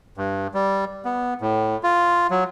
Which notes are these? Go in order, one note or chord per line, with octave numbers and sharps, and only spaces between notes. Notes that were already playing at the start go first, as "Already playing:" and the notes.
G2
G3
B3
A2
F4
F#3